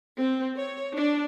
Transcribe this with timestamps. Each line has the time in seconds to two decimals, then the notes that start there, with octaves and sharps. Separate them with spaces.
0.19 C4
0.58 C#5
0.94 D4